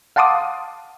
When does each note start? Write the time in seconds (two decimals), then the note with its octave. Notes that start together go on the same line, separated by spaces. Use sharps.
0.16 F5 F#5 A5 C6 D6 D#6